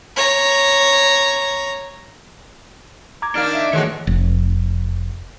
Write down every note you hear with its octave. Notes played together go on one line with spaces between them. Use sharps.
C#5 A#5
A#5 D6 G#6
D#3 A#3 D4 D#4 F6
E5
D#3 E3 G#3 A3 F#4 C#5
F1